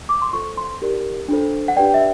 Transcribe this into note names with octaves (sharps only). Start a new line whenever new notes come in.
D6
C6
F4 A4 C5 C#6
C6
D#4 G4 A#4 D5
D4 F4 A4 C5
F#5
D4 G4 B4 D5 G5
E5